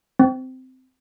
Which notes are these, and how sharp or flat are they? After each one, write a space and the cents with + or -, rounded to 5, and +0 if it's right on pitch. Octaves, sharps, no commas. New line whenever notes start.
C4 -15